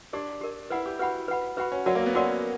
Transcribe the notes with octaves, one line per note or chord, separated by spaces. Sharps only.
D4 G4 A#4 D5
G4 A#4 D5
E4 B4 F#5 B5
G4
F#4 B4 F#5 B5
B4 F#5 B5
F#4 B4 F#5 B5
C#4
F#3 F#4 A#4 D5 F#5
A#3
B3
C#4 F#4 A#4 D5 F#5